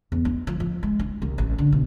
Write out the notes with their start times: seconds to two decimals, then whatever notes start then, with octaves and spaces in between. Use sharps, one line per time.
0.12 E2
0.25 E4
0.47 F3
0.60 F3
0.83 G#3
0.99 E4
1.22 C2
1.38 A1
1.58 D3
1.72 B2